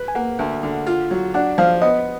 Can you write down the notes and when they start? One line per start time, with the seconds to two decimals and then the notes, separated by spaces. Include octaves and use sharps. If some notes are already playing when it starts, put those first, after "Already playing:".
Already playing: B4
0.08 G#5
0.15 A#3 F#5
0.39 D2
0.63 D3
0.87 F4
1.11 F#3
1.34 D4 F#5
1.58 F3 F5
1.82 B3 D#5